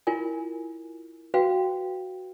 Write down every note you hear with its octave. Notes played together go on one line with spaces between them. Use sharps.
E4 F4 A#4 G#5
F#4 B4 F5 G5